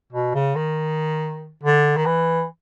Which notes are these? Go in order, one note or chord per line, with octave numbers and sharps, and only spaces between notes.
B2
C#3
D#3
D3
D#3
E3